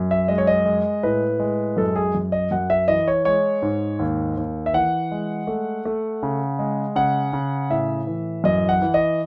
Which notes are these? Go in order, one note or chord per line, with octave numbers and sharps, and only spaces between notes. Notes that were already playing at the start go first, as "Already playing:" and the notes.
Already playing: F#2
E5
G#3 D#5
C#5
D#5
G#3
A2 B4
G#3
F#2 A4
G#4
F#2
D#5
F#2 F#5
E5
E3 D#5
C#5
G#3 C#5
G#2
D#2
D#2
E5
E3 F#5
G#3
A3
A3
C#3
G#3
C#3 F#5
C#3
A2 E5
E3
F#2 D#5
F#5
E3
D#5